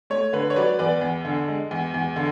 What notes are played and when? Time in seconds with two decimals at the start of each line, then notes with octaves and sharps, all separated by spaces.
0.10 A3 C#5
0.33 D3 B4
0.50 C#5
0.56 F#3 B4 D5
0.79 E2 B4 D5
1.01 E2
1.25 D3
1.48 G#3
1.71 E2
1.94 E2
2.16 D3